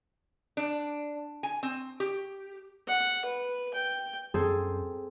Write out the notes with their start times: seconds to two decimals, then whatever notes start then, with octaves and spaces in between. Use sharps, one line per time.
0.57 D4
1.43 G#5
1.63 C4
2.00 G4
2.88 F#5
3.25 B4
3.75 G5
4.34 F#2 C4 G#4 A4